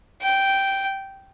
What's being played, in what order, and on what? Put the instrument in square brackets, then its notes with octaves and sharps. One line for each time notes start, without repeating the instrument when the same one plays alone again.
[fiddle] G5